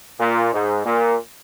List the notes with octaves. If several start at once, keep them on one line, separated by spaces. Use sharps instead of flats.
A#2
G#2
A#2